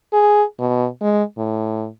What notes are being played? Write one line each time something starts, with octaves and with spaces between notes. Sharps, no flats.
G#4
B2
G#3
A2